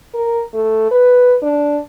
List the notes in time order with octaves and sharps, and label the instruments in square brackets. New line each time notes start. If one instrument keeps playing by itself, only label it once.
[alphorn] A#4
A3
B4
D4